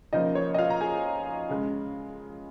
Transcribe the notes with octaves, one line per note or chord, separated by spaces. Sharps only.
C#3 F3 A#3 D#4 D#5
C#5
D#5
F4 F5
A#5
G#4 G#5
C#3 G#3